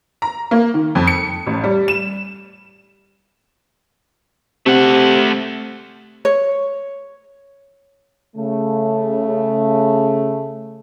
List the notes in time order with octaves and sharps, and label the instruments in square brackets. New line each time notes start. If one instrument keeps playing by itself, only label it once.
[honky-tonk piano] A#5
A#3
D#3
F2
C#7
A1
G3
E7
[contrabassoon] C3 [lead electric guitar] A3 F#5
[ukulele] C#5
[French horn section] C#3 A3